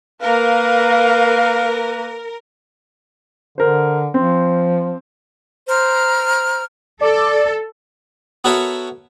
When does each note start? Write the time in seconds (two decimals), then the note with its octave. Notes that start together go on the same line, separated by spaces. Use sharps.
0.22 A#3 A#4 B4 F5
3.58 D3 A#4 C5
4.14 F3 C4
5.68 C5 A#5 F6
7.01 A4 D5
8.44 B3 F#4 A4 A#4 C#5 E5